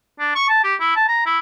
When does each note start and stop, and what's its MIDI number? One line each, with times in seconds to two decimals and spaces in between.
0.20 0.35 62
0.35 0.46 85
0.49 0.63 81
0.64 0.75 67
0.80 0.95 64
0.96 1.06 81
1.08 1.23 82
1.26 1.39 64